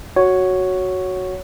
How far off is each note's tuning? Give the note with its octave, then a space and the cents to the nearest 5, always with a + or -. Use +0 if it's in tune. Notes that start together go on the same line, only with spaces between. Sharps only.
F#4 +0 C#5 +0 F#5 +0